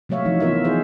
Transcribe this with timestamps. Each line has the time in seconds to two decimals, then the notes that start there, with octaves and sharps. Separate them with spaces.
0.09 C3 F#3 A3 C#5 E5 F5
0.25 E3 F3 D#4
0.40 B3 F4 A#4 C#5 E5
0.64 D#4 G#4 C5